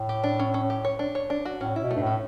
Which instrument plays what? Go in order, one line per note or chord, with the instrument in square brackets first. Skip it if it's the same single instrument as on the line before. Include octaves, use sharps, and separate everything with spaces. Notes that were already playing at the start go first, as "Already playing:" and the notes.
Already playing: [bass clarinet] A2
[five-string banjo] G4
D4
C#4
C#4
G4
C#5
D4
C#5
D4
F#4
[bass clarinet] A2 [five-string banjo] C#4
[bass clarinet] B2 [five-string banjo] E4
[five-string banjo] A3
[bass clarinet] G2
A2
[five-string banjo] C#4